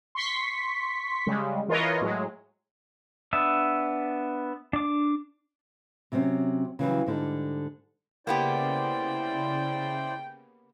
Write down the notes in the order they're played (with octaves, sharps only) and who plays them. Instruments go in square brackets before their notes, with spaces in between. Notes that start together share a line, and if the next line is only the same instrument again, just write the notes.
[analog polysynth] C6 C#6 B6
C#3 G3 G#3
E3 F4 A#4 B4 C#5 D#5
A2 F#3 G#3
[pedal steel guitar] B3 D4 E5
D4 D6
[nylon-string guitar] C3 F#3 C4 C#4
C#3 E3 F#3 G3
G#2 D3 G3 D#4
[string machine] C#3 [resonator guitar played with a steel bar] A#3 B3 G4 [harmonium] E4 C5 D5 [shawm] G5